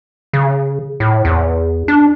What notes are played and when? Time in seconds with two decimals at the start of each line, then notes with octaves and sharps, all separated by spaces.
0.33 C#3
1.00 A2
1.25 E2
1.88 D4